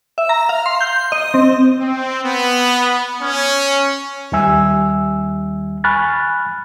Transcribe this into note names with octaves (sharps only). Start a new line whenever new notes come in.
E5
A#5
F5
C6
G6
D#5
C4
C4
B3
C#4
D#2 D#3 G3 E5 G#5 E6
G#5 B5 C#6 F6 F#6 A6